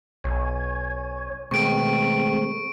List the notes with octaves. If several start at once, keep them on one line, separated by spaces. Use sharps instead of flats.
B1 C#5 G#5
B2 D#3 G#3 A3 C4 C#6 D7